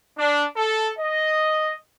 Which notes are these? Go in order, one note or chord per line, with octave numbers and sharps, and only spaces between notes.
D4
A4
D#5